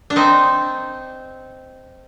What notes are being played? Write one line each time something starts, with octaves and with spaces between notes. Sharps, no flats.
D4
C4 D#4